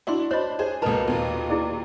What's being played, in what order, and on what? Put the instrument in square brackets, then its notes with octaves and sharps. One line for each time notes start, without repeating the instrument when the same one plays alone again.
[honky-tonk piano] D4 E4 F#4 [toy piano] D5 C6
[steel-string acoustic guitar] D4 [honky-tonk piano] C5 B5 [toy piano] C#5 D#5
[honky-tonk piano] G#4 C5 G#5
[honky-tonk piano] C#2 A#5 [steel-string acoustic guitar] B2 A#3 [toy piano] A4 A5
[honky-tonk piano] D#2 A#2
[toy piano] E4 G#4 D5